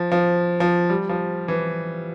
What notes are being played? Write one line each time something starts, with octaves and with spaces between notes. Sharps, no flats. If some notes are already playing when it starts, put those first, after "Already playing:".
Already playing: F3
F3
F3
G3
F3
E3